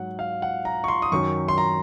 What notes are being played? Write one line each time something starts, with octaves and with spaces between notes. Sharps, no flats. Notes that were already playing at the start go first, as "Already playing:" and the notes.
Already playing: G#2 F#3 F#5
F5
F#5
A#5
C#6
C6
D#6
F#2 D#3 F#3 C#6
C6
A#5